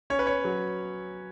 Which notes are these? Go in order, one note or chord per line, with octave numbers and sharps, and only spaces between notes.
C#4 C#5
B4
C#5
F#3